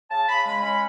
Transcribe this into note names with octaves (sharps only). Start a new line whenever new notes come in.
C#3 A5
C#3 B5
G#3 B5
C#4 B5